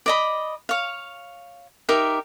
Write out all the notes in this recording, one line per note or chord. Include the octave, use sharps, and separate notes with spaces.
D5 D#5 B5
C#5 F5
D#4 G4 A#4 E5